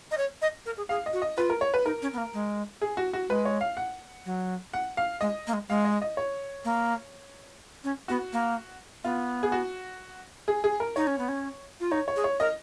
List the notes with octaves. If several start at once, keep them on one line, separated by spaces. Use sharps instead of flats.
D#5
C#5
D#5
A#4
G#4
G#4 F5
D#5
F#4
D#5
F4 B4
A#4
C#5
B4
D#4 A#4
C#4
B3
A#3
G#3
G#4
F#4
F#4
G#3 B4
C#5
F5
F#5
F#3
F#5
F5
G#3 D#5
A#3
G#3
G#3 F5
D#5
D#5
C#5
A#3
C#4
B3 F#4
A#3
B3 F4
G#4
F#4
G#4
G#4
A#4
D#4 C#5
C#4
B3
C#4
F4
D#4 C#5
C#5
G#4
C#5
A#4 D#5